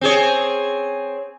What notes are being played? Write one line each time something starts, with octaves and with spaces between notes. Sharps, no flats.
C4 G#4 C#5